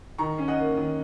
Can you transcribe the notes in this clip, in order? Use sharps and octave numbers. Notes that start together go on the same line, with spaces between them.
D#3 A#5 C#6
C#4
D#5 F#5
A#3
D#3